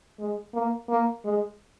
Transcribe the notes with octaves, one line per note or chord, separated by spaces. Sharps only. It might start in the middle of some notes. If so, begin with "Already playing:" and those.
G#3
A#3
A#3
G#3